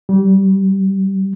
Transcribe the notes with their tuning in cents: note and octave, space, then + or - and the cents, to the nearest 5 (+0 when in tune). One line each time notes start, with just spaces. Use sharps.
G3 -25